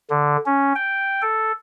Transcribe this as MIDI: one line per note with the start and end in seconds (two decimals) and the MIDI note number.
0.10 0.37 50
0.46 0.73 61
0.75 1.22 79
1.22 1.52 69